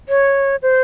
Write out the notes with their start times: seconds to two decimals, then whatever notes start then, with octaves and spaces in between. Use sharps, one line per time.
0.09 C#5
0.62 C5